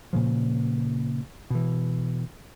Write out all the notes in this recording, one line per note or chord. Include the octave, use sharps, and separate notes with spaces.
A#2 C#3 F3
B2 E3